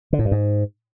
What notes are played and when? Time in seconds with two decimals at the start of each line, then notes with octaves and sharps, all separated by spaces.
0.13 D3
0.19 A2
0.25 G2
0.31 G#2